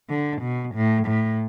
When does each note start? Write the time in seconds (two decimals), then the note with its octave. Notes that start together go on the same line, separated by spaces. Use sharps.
0.10 D3
0.42 B2
0.75 A2
1.08 A2